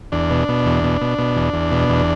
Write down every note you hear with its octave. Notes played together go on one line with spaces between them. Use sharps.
E2 D4
B2
B2
E2
B2
B2
B2
E2
E2
B2
E2